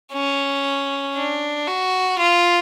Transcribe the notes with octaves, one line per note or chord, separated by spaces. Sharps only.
C#4
D4
F#4
F4